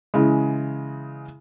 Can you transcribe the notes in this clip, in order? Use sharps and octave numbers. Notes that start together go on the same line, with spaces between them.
C#3 E3 G#3